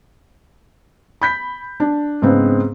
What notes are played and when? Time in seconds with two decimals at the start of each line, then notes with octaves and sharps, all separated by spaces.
1.22 B5 G6 B6
1.80 D4
2.22 G#2 C#3 B3 C4